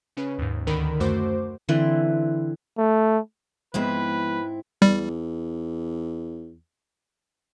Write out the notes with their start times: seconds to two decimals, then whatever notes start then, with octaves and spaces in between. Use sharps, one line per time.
0.17 C#3 C#4 B4
0.38 D#2 G#2
0.67 D2 D3 D#3 A#4 B5
1.00 F#2 A3 F#4 C5 D6
1.69 D3 E3 C4 B4
2.78 A3
3.74 G#2 F3 G#3 B3 C4 E4 B4
4.82 E2 G3